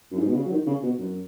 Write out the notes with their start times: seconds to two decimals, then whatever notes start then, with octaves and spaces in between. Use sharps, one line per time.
0.11 F#2
0.19 G#2
0.27 B2
0.35 C#3
0.45 F#3
0.51 D#3
0.67 C#3
0.83 B2
0.98 F#2